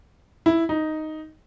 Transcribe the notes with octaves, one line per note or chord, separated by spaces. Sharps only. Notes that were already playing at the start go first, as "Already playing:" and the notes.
E4
D#4